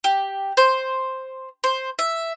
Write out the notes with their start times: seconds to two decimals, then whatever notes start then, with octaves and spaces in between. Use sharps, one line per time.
0.04 G4
0.57 C5
1.64 C5
1.99 E5